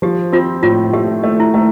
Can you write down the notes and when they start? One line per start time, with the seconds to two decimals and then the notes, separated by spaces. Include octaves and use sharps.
0.02 F3 G4
0.32 C4 F4
0.63 A2 F4
0.93 A3 G4
1.24 A3
1.40 E4
1.54 A3